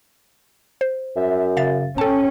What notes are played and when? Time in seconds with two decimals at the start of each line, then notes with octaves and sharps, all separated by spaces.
0.81 C5
1.16 F#2 E5
1.57 C#3 E5 F5 A6
1.98 C#4 A4 G5 A5